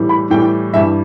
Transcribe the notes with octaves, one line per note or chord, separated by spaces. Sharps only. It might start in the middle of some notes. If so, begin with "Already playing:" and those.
Already playing: A2 E3 G3
B5
A2 E3 G3 G5
G2 E3 G3 E5